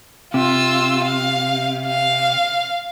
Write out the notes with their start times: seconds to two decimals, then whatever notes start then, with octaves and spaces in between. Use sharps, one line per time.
0.34 C3 F4 E6
1.04 F5
1.86 F5